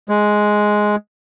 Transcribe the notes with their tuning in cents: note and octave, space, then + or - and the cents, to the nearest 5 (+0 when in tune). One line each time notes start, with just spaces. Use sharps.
G#3 +5